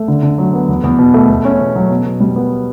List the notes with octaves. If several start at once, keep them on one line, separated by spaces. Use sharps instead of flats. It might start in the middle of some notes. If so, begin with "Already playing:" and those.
Already playing: A3
D3
D3
F#3
B3
E2
E2
B2
A3
E2
C#4
B2
F#3
B2
B2
G3
B3